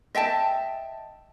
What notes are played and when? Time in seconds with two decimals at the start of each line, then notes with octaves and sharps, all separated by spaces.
0.15 D#5 E5 G5 A5